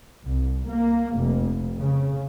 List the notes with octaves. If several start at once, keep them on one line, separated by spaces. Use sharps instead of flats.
C2
A#3
F1
C#3